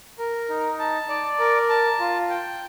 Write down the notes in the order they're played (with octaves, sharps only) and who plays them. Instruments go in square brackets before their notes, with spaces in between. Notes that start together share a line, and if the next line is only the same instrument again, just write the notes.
[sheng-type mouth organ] A#4
D#4
A5
D5
A#4
A5
F4
G5